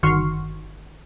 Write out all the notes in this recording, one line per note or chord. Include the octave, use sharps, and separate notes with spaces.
G1 D#3 F#4 C6 C#6 F6